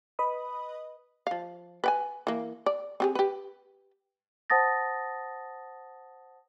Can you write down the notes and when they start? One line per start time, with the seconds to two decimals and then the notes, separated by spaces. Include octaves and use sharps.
0.19 B4 D#5 B5 D#6
1.27 F3 F5
1.84 B4 G5 G#5
2.27 E3 A#3
2.66 D5
3.00 C4 G4 G#4
3.15 G4 B4
4.50 C5 F#5 A5 D#6 A6 A#6